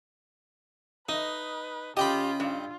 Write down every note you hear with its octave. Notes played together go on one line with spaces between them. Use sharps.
D#4 B4 D#5
C#3 C#4 F4 G4 D#5 G5 B5
G2 F4